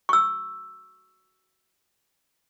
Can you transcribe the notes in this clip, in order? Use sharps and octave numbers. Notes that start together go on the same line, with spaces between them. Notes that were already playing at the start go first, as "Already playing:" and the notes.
C#6 E6